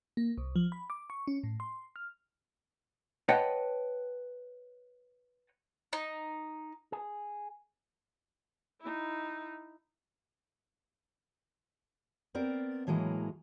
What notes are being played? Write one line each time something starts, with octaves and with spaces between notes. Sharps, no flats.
A#3
C2
F3
B5
D6
C#6
C#4
A2
C6
F6
B4 C#5 D#5 F#5 G5 A5
D#4
G#4
D#4 E4
B3 C4 A#4 D5
A2 E3 F#3 G#3 A#3